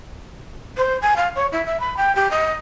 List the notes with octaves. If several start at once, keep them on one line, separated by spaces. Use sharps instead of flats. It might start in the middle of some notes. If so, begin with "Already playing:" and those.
C5
G#5
F5
C#5
E4
E5
B5
G5
G4
D#5